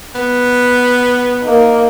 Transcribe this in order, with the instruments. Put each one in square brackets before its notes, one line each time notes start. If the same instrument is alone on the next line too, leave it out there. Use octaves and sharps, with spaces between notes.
[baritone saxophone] B3
[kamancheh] A#3 D#4